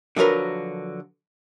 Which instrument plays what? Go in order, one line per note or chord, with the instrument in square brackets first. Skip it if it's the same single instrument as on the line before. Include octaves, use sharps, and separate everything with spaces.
[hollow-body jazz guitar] D3 F3 F#3 A#4 B4